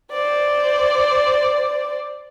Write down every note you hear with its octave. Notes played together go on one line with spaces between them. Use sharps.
C5 D5